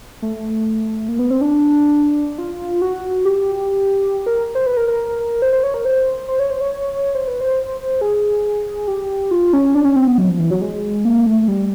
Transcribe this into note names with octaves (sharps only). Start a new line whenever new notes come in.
A3
A#3
B3
C4
D4
F4
F#4
G4
A#4
C5
B4
A#4
A#4
C5
C5
C#5
A#4
C5
C5
C#5
C5
C#5
C5
B4
C5
G#4
G4
F4
C#4
D4
C#4
C4
B3
F#3
F3
E3
F#3
G#3
A#3
A3
G3